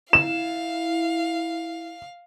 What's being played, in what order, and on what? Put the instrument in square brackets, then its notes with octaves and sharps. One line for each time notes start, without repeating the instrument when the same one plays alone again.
[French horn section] E4 [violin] F5 [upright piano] E7